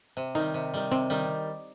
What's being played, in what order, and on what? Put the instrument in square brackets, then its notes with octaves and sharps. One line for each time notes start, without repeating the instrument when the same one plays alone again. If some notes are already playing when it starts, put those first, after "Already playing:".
[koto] C3
[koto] D#3 G3 [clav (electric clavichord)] D#4
[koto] C3
D#3 G3
[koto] C3 [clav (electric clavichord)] C4
[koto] D#3 G3